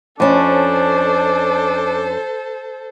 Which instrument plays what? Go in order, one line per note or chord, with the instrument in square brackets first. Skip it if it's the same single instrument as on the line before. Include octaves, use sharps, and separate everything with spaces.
[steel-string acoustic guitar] F2 C#4 [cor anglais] D4 [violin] A4 C5